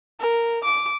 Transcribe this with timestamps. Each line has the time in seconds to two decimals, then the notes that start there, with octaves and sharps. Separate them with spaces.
0.19 A#4
0.64 D6